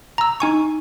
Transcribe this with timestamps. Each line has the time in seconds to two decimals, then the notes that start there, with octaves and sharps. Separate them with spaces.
0.18 A#5 E6
0.40 D#4 G#5 C#6